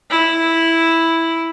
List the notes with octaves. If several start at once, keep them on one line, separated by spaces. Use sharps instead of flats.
E4